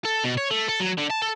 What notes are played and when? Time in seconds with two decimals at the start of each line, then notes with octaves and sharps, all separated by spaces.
0.05 A4
0.24 B2
0.37 C#5
0.50 A3
0.68 A4
0.80 F#3
0.98 D3
1.10 A5
1.22 A4